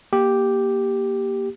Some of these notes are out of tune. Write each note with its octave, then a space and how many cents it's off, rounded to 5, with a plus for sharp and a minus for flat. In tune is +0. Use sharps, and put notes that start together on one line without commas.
A#3 +15 G4 +0